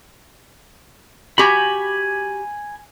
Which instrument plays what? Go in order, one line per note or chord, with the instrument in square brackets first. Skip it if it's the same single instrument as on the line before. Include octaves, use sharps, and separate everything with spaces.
[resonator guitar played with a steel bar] F#4 G4 [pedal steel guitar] G#5 B5